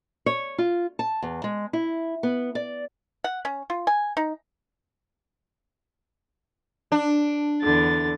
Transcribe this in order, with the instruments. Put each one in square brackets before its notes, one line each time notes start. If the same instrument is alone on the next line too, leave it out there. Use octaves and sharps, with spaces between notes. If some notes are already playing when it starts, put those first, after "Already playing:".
[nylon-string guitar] C#5
F4
A5
E2
G#3
E4
B3
D5
[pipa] F#5
C#4
F4
G#5
D#4
[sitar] D4
[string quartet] E2 D3 A6